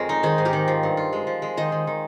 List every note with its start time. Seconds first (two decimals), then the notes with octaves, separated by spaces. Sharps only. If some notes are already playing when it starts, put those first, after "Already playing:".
Already playing: F2 G#3 C4 A#4 C#5 D#5
0.09 D#4
0.23 D#3 G#4 C5
0.38 G#2
0.45 G4 A#4
0.53 D#3
0.68 F3
0.83 G2
0.97 F4
1.13 G#3
1.27 F3
1.42 G#3
1.57 D#3 C5 D#5
1.72 D#3
1.87 D#3